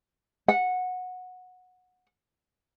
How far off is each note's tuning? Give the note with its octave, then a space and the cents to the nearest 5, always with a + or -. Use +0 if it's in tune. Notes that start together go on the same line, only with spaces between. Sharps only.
F#5 -15